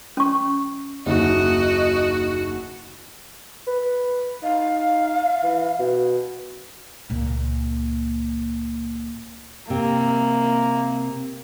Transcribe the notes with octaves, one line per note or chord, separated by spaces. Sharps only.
C#4 C#6
F#1 D#2 F#4 D#5
B4
D#4 F5
E3
B2
C#2 A#2
C3 A#3